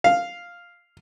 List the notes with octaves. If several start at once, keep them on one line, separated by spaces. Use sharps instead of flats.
F5